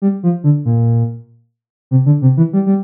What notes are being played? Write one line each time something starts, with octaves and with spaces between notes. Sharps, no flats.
G3
F3
D3
A#2
C3
D3
C3
E3
G3
G3